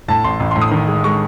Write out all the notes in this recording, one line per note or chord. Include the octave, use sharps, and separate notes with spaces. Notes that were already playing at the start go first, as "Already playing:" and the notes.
A2 A5
A1 C6
A1
C6
A2
D#6
D#3
G#3
G#3 C#6